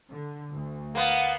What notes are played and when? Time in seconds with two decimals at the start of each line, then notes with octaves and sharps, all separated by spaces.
0.12 D3
0.54 D2
0.95 A#3 B3 F5 F#5